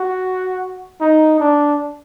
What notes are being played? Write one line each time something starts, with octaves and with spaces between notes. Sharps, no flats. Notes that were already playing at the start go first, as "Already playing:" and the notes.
Already playing: F#4
D#4
D4